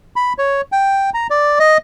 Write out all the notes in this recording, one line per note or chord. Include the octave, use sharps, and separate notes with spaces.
B5
C#5
G5
A#5
D5
D#5